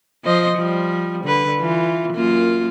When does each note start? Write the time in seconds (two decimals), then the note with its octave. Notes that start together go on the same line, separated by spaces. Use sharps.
0.24 F3 C5 D#5
0.57 F3 G3
1.24 D3 B4
1.60 E3 F4
2.14 F#2 A#3 F4